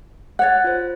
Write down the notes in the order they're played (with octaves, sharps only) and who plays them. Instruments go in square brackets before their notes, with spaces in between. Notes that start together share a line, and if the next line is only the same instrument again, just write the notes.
[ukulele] C#5 F#5 [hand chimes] F#6 A6
[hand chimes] F4 C5